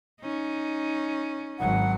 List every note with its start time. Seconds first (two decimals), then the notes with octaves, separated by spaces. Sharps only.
0.20 C#4 D#4
1.59 G#1 F#3 F#5